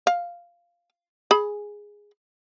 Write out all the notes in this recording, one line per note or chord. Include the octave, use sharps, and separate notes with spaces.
F5
G#4 B5